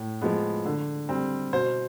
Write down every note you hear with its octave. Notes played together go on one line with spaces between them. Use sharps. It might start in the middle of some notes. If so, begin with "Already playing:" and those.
Already playing: A2
F3 G#3 B3
D3
G3 C4
B2 C5